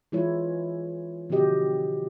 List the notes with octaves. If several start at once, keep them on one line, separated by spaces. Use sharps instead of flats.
E3 G#3 E4 F4 C#5
B2 D3 F3 F#4 G4 D#5